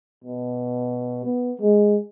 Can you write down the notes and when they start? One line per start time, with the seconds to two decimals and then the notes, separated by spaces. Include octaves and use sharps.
0.24 B2
1.24 B3
1.61 G#3